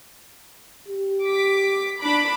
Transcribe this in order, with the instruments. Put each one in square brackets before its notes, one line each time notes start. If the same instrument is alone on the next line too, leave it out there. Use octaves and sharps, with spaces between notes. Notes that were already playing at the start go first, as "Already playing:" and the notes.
[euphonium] G4
[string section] D6 B6
D4 B5 D6